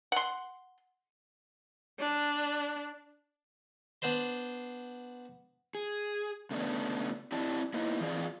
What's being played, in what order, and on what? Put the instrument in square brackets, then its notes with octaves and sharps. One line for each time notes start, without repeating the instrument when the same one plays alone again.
[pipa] F#5 C6
[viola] D4
[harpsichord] B3 D4 C5 C6
[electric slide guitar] G#4
C#3 A3 B3 D4
C4 E4 G4 D5 A5
A#3 B3 D#4 E4
E3 F3 C4 F4 G#4 D5